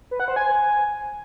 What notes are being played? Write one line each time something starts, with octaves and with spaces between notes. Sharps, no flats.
B4
F#5
C5
G#5